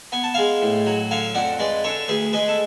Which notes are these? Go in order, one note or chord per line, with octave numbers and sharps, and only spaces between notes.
B3 G#5
A5
G#3 F5 G#5
A2
F#3
D3 F5 G#5
F2 D5 F#5
G#3 B4 D5
D3 A4 C#5
D2 G#4 B4
G#3 G#4 B4
A4